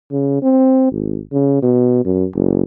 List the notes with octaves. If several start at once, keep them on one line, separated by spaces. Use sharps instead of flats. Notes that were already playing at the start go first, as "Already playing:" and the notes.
C#3
C4
G#1
C#3
B2
F#2
F#1